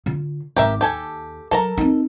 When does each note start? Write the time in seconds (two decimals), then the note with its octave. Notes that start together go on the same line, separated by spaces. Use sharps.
0.06 D3 F4
0.56 G#1 D#3 G4 A#4 E5
0.81 D#2 G4 A4 G#5
1.51 F#3 A4 A#4 A#5
1.77 C4 D#4